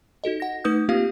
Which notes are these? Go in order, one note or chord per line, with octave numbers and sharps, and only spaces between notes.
D#4 F#4 A4 D#5
F#5 A#6
A3 D#4 B4 D#6 G6
A#3 C4 F4 G4 F5